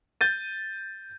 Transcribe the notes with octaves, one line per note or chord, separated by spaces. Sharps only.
G6 A6 D#7